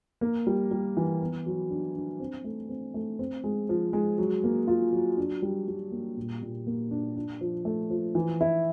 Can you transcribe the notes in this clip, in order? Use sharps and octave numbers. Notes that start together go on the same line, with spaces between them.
A#3
G3
G3
E3
B3
F#3
D4
D4
C4
A3
C4
A3
C4
G#3
F3
G#3
F#3
A#3
F4
F#3
D4
G3
G3
A#3
A#2
A#2
A#3
D4
D4
F3
A3
F3
E3
E4